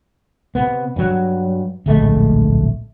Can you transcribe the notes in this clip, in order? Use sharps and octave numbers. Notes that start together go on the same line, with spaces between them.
C3 B3
G2 F#3
D1 A#1 G#3 A3